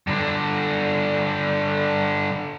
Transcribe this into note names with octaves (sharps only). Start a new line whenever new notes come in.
G2 D3